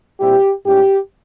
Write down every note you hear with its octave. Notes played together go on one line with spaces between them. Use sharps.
A#2 G3 C4 E4 G4
G#2 G3 C#4 E4 G4